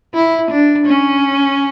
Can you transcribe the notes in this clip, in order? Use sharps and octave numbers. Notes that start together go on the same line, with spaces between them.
E4
D4
C#4